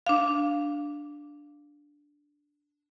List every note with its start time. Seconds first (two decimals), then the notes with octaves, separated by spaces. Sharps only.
0.06 D4 F5